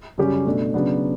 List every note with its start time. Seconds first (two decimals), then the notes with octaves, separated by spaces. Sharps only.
0.18 F#2 C#3 G3 C#4 G4
0.45 B2 A3 D4
0.74 C#3 F#3 B3 D4